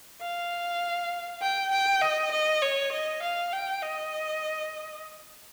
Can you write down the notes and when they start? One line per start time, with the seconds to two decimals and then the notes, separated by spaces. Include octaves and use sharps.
0.21 F5
1.42 G5
1.71 G5
2.01 D#5
2.32 D#5
2.62 C#5
2.93 D#5
3.23 F5
3.52 G5
3.83 D#5